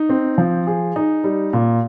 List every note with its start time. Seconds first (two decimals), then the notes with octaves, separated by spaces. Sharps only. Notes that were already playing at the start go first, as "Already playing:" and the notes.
Already playing: D#4
0.09 C4
0.38 F3
0.67 G#4
0.96 D#4
1.24 G3
1.53 A#2